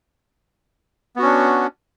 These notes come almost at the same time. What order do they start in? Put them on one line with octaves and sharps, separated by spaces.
B3 F#4 C#4 D4